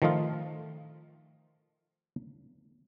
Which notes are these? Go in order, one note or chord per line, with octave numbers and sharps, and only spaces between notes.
D#3 F3 A3 D#4 F4